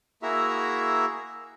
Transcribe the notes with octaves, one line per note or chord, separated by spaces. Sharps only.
A#3 E4 F#4 G#4 E5 A#5